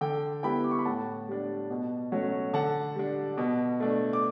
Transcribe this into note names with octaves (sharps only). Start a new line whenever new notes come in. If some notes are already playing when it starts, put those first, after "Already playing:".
D3 G5
G3 B3 E4 G5 B5
D6
C#6
B5
A2 F#5 A5
G3 D4
B2
F#3 A3 C#4
D3 F#5 A5
G3 D4
B2
A3 D4
D6